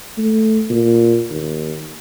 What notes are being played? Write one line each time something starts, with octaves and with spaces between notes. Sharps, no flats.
A3
A#2
D#2